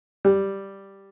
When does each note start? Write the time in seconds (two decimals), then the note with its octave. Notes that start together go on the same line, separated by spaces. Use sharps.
0.25 G3